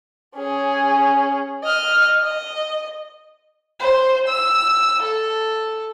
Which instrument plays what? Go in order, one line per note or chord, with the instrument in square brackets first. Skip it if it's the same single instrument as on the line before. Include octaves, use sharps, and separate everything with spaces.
[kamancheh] C#4 G#4
D#5 F6
D#5
C5
E6
A4